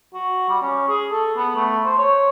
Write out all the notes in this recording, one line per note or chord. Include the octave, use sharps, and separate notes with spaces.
F#4
G3
C#4
G#4
A4
B3
A3
C5
C#5